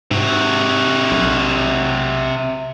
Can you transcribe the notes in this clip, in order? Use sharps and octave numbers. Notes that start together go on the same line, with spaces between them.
G#2 C3 F#4
B1